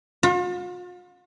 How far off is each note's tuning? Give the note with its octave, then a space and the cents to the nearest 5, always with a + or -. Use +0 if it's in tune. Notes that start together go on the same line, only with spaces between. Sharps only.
F4 +45